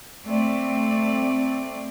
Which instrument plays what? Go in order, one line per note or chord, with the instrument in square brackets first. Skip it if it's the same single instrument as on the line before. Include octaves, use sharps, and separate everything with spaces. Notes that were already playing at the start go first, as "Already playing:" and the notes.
[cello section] A3 C4 D5